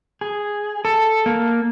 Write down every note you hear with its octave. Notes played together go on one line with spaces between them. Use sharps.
G#4
A4
A#3